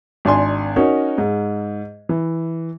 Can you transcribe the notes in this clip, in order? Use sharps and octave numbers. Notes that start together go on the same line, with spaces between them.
G#1 D4 G#5 C6
C#4 D#4 F#4 A#4
G#2
E3